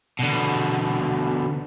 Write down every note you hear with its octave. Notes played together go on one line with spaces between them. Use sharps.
B2 D3